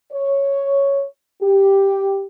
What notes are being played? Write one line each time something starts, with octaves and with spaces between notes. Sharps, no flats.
C#5
G4